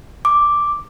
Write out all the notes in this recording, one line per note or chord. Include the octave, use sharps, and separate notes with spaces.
D6